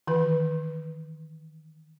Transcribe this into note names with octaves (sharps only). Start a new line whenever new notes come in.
D#3 E3 B4